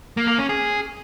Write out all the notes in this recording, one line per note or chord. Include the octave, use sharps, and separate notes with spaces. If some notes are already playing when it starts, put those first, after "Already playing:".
A#3
A#3
C#4
G#4